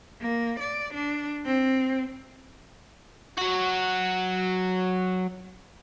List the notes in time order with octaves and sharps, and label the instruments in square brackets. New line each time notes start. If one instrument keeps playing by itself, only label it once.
[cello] A#3
D5
D4
C4
[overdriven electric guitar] F#3 F#4